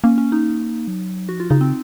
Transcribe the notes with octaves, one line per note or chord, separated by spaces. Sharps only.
A#3 C#4
C#4
D#4
F#3
F3 F#4
F4
C#3 D#4
C4